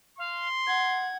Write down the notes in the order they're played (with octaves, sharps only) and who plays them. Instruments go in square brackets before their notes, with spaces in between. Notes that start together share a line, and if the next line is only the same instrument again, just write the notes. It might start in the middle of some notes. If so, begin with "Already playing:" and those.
[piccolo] F5 [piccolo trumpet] C6
[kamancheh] F#5 [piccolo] G#6